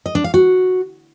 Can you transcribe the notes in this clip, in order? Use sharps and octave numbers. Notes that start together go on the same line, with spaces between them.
D#5
D4
F5
F#4